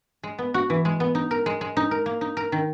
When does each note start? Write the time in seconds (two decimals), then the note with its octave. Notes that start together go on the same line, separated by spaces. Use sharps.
0.23 G#3
0.39 B3
0.54 F#4
0.70 E3
0.85 G#3
1.00 B3
1.15 D#4
1.31 A#4
1.46 G#3
1.61 G#3
1.77 D#4
1.91 A#4
2.06 A#3
2.21 D#4
2.37 A#4
2.52 D#3